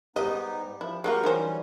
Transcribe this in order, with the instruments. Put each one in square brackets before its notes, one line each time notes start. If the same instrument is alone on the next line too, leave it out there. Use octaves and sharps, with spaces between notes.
[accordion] G#2 B3 D#4 [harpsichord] G3 G4 D6 [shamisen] D#5
[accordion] F3 [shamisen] E4
[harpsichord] F#3 [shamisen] G#3 A#3 F4 [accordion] G4 A#4 C#6
[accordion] E3 G3 C#4 [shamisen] D#4 A#4 C5